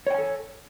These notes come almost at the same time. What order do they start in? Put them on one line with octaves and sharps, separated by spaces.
C#5 G5 G#5 A4